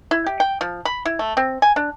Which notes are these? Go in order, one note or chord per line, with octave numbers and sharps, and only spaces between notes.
E4
G4
G5
F3
B5
E4
A3
C4
G#5
D4